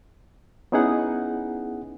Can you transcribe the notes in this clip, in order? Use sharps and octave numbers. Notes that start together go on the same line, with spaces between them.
B3 C#4 D#4 E4 G#4 F#5